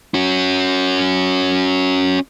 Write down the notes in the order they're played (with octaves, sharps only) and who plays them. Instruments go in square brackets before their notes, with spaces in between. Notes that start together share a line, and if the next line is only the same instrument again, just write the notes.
[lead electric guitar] C#4 F#4